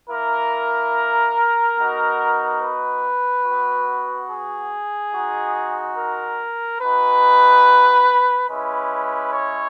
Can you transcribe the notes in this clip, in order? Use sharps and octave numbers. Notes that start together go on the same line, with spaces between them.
A#3 E4 A#4
B3 D#4 F#4
B4
B3 F#4
G#4
G#3 D#4 F#4
A#4
G#3 D#4 F#4 B4
G#3 C#4 E4 B4
C#5